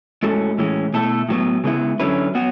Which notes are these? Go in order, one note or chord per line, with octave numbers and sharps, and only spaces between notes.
A2 G#3 C#4 F#4 A4
A2 E3 G#3 C#4
B2 A3 E4 A4
A2 F#3 B3
C#3 G#3 B3 E4
D3 F#3 C#4 E4 B4
F#3 B3 F#4